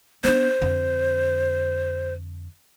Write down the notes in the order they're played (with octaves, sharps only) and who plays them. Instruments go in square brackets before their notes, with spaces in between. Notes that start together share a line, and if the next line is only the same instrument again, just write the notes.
[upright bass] B3 D4 [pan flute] C5
[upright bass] F2 D3